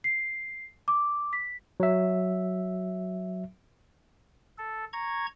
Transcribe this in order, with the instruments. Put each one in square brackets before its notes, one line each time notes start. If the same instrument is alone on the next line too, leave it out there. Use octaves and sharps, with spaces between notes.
[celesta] C7
D6
B6
[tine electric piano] F#3 E5
[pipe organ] A4
A#5 C#6 G#6